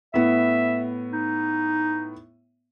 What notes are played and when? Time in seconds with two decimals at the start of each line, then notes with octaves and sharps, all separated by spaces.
0.14 A2 B3 E5
1.13 D#4